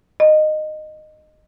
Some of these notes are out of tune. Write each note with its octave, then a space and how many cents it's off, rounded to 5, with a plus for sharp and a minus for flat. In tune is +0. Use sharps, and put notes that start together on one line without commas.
D#5 -15